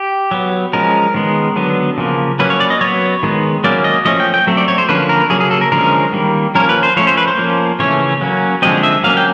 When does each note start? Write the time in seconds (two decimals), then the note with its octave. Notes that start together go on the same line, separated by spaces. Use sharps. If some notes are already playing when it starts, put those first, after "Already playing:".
Already playing: G4
0.31 F#3 B3
0.73 F3 G#3 C#4 A#4
1.14 D#3 G#3 B3
1.56 D3 F#3 B3
1.98 C#3 F3 A#3
2.39 F#3 A#3 C#4 B4
2.50 C#5
2.60 D5
2.70 D#5
2.81 F#3 B3 C#5
3.23 D#3 G#3 B3
3.64 F#3 A#3 C#4 D5
3.84 D#5
4.05 F3 A3 C#4 D#5
4.20 G5
4.34 G5
4.47 F#3 A3 C4
4.57 D5
4.68 C#5
4.78 C5
4.89 D3 F3 A#3 C#4 B4
5.09 A#4
5.30 C#3 F#3 A#3 G#4
5.40 G#4
5.51 A4
5.61 A#4
5.72 D3 F3 G#3 C#4 A#4
6.13 D#3 G3 A#3
6.55 F3 A#3 C#4 A#4
6.69 B4
6.83 C5
6.96 F3 A3 C#4 C#5
7.07 C5
7.17 B4
7.28 C5
7.38 F3 A#3 C#4
7.79 C#3 E3 A3 C#4 C#5
8.21 F#3 A#3 C#4
8.62 D3 F3 G#3 C4 D#5
8.83 E5
9.04 F#3 A#3 C#4 F5
9.17 G5